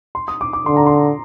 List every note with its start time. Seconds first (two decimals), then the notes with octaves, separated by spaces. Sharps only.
0.15 C6
0.28 D#6
0.41 D6
0.53 D6
0.66 D3 C6
0.77 A#5
0.87 C6